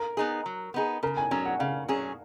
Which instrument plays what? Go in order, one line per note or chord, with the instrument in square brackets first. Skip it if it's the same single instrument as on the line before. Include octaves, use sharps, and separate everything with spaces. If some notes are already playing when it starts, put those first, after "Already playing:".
Already playing: [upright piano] A#4
[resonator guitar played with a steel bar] B3 D#4 G#4
F#3
B3 D#4 G#4
[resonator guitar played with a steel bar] C#3 [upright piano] A#4
[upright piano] G#5
[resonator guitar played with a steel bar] F#3 C#4 G#4 [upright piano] G#5
[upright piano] F#5
[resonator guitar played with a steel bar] C#3 [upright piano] F5
[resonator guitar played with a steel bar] F#3 C#4 G#4